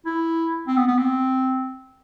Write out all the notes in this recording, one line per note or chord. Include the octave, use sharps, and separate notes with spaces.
E4
C4
B3
B3
C4